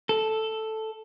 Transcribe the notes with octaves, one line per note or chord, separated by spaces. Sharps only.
A4